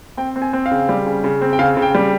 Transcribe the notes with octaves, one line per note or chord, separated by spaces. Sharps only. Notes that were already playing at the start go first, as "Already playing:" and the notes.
C4 G5
C4
G#5
C4
F5
C#3
G3
C#3
C#3
C4
G5
C#3 F5
C#3
G5
G3